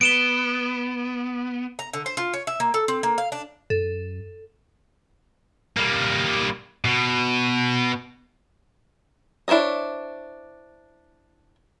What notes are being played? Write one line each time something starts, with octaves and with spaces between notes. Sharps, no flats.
B3 D7 E7 G7
A#5
D3
C5
F4
C#5
E5
A#3
A4
C4
A#3
F5
D4
F#2 A4
G3 A#3
B2
D4 E4 C5 C#5 D#5